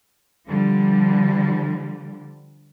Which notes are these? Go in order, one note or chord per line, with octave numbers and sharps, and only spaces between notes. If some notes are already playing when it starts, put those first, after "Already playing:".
D3 F3 G3